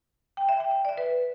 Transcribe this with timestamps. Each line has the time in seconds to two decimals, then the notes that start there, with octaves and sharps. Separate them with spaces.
0.37 G5
0.49 E5
0.60 G5
0.71 G5
0.85 D5
0.89 E5
0.98 B4